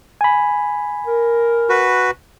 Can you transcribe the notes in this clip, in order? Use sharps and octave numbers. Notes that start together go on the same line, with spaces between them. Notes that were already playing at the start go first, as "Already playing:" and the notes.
G#5 B5
A#4
F#4 B4